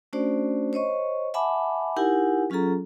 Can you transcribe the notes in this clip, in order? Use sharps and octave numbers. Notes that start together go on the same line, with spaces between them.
A3 C#4 D4 F#4 C5 D5
C5 C#5 D#5 C#6
E5 F#5 G#5 A5 B5 D6
D#4 E4 G4 A#4 F#5 G#5
F#3 C#4 F4 G#4 A4 A#5